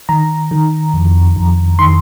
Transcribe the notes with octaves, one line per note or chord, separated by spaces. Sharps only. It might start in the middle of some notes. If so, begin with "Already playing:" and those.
D#3 A#5
D#3
F2
F2
D#3 C6